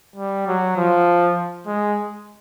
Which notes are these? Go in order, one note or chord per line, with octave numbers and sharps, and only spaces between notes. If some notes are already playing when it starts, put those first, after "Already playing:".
G3
F#3
F3
G#3